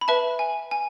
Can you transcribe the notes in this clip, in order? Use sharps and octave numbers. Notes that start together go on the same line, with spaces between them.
B5
B4 E5 A5
G#5
G#5